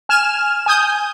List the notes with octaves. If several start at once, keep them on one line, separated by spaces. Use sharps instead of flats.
G#5 F6 E7
G#5 D#6 G6